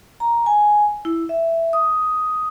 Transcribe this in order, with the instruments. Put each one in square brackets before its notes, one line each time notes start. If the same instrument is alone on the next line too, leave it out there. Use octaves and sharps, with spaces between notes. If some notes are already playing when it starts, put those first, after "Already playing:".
[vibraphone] A#5
G#5
E4
E5
D#6